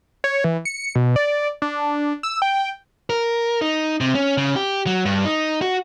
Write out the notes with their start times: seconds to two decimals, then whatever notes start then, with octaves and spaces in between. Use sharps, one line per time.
0.24 C#5
0.44 E3
0.65 C#7
0.95 B2
1.16 D5
1.62 D4
2.23 E6
2.42 G5
3.10 A#4
3.62 D#4
4.01 C3
4.15 C#4
4.38 C#3
4.56 G4
4.87 F#3
5.05 G2
5.25 D#4
5.62 F#4